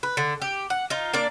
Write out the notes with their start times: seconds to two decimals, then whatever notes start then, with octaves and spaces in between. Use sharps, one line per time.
0.03 B4
0.17 D3
0.42 G4
0.70 F#5
0.90 D#4 F4
1.14 A#3 D4 D5